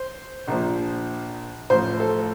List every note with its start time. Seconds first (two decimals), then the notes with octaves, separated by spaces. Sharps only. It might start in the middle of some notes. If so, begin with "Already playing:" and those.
Already playing: C5
0.48 A#1 A#2 F3
1.70 A1 A2 F3 C5
2.00 A4